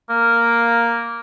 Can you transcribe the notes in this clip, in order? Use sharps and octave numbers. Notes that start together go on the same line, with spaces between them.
A#3